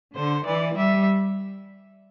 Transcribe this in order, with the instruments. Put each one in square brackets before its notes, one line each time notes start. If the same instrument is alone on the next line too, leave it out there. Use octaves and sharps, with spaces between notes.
[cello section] D3 [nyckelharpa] C5
[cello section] E3 [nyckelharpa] D5
[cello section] G3 [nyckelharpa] E5